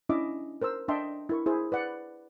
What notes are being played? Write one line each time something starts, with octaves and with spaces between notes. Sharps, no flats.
C#4 D4 E4 D#5 E5 D6
A#4 C5 A#5 E6
D4 D#5 E5 G5 A5 C6
E4 A#4 C#6
E4 G#4 C5
B4 D5 F#5